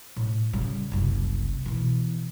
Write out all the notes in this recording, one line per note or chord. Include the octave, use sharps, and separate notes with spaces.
A2
C#3 G3
F#1 C2
B2 E3